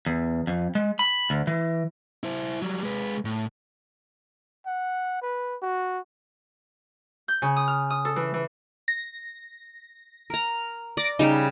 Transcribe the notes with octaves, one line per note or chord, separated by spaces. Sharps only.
E2
F2
G#3
B5
D2
E3
E4 C5
F#3 G3
G#3 B4
A2
F#5
B4
F#4
G6
C#3
D#6
F6
D#6
A4
E3
E3
A#6
A#4 A#5
D5 D6 A#6 D7
C#3 G3 D#4 G4